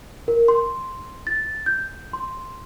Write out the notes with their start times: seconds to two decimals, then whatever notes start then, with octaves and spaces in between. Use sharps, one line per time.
0.28 A#4
0.48 C6
1.27 A6
1.66 G6
2.13 C6